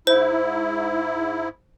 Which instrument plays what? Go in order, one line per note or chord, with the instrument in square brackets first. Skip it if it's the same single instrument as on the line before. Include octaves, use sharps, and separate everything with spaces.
[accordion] G#2 E4 [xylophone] C5